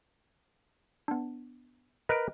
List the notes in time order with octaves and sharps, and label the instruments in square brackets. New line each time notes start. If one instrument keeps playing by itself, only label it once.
[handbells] B3 D4
[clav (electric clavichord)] A#4 B4 [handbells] D#5 F#6 D7